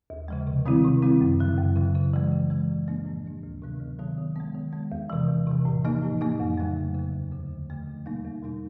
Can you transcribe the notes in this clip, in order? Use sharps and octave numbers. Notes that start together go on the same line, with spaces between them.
D#2
C#3 F3 G#3
C3
D#3 G3 C4 E4
C3
D#3 G3 C4 E4
F#2
C#3 F#3
F#2
C#3 F#3
C#3
E3 G#3
C#3
E3 G#3
A2
F3 A#3 D4
A2
F3 A#3 D4
D2
C3 D#3 F#3 B3
D2
C3 D#3 F#3 B3
D#3
G#3 B3
D#3
G#3 B3
E2
C3 E3
E2
C3 E3
A2
F3 A#3 D#4
A2
F3 A#3 D#4
F2
C#3 F#3 A3
F2
C#3 F#3 A3
D#2
D3 F3 A3
D#2
D3 F3 A3
E2
B2 G3 A#3 D#4
E2
B2 G3 A#3 D#4